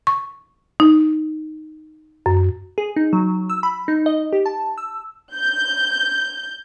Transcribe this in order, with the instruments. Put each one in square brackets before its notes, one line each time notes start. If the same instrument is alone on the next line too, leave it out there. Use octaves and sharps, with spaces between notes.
[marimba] C#6
D#4
F#2
[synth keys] G#4
D#4
F#3
E6
B5
D#4
D#5
G4
A5
E6
[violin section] G6